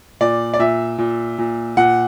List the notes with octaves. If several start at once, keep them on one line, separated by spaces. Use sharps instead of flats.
A#2 D5
D5
A#2 E5
A#2
A#2
A#2 F#5